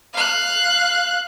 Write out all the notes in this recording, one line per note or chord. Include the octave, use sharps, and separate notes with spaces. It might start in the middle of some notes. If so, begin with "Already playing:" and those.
F5 F#6